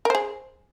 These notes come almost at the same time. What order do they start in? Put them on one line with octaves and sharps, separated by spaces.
A#4 C5 G#4